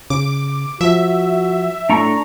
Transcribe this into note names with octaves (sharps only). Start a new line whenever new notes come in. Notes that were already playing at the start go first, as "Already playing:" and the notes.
C#3 D6
F3 F#4 E5
A2 D4 A#5 C#6